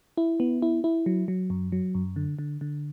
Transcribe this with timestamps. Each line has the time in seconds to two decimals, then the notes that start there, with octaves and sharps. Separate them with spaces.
0.17 E4
0.40 B3
0.62 E4
0.84 E4
1.06 F#3
1.28 F#3
1.50 F#2
1.72 F#3
1.95 F#2
2.16 D3
2.39 D3
2.61 D3